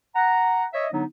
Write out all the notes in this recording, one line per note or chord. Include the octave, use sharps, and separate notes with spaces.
F#5 A#5
C#5 D#5 E5
D3 F#3 B3 D4 D#4